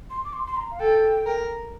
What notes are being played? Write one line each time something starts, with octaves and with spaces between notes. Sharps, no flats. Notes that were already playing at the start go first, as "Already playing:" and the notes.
C6
D6
C6
C6
A#5
F5
A4 G5
A#4